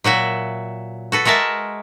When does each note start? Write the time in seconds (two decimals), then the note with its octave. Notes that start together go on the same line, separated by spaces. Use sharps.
0.04 A#2 F#3 F#4 E5
1.12 F#4 A4 B4
1.25 G#3 F#4 A#4 E5 A5